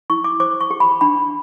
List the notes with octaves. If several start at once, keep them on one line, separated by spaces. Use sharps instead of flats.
E4 C#6
D6
C5 D6
C#6
G4
B5
D4 B5